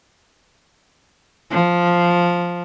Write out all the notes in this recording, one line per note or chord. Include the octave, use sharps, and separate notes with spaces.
F3